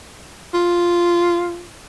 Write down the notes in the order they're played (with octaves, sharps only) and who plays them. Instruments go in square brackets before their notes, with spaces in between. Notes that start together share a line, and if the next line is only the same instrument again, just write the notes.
[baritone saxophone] F4